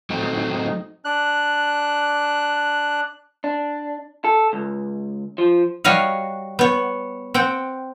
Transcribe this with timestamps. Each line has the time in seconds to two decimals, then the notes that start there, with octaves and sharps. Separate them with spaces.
0.10 F#3 A3 C4 D#4
1.05 D4 F#6
3.44 D4
4.24 A4
4.53 C#2
5.38 F3
5.84 G3 F#4 C#5 D#5 F5 F#5
6.59 B3 C#5
7.34 C4 F#5 G5